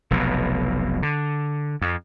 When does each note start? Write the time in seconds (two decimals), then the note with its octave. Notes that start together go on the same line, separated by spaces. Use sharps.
0.11 F1 B1 F2 B2
1.03 D3
1.82 F2